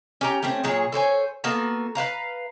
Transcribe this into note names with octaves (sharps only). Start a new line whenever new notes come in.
C#4 G4 A#5
A3 C4 C#4 G4
A#2 F#3 G#4 C#5
A4 C5 C#5 G#5
A#3 B3 F#4 A4
B4 C5 F5 A#5